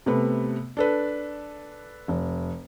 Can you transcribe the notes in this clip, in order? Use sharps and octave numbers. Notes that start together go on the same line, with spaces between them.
C3 A3 B3
D4 A4 B4
F1